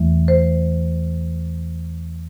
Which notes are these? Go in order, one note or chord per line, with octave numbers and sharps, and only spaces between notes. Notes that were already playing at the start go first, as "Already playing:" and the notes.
Already playing: E2 E3 A3
C5